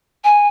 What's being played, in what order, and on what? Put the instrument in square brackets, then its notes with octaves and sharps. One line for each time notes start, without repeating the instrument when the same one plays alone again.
[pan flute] G#5